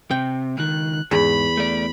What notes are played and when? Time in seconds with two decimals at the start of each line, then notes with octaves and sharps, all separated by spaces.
0.11 C3 G5
0.58 C#2 D#3 F#6
1.11 E2 G#2 B5
1.57 A3 D5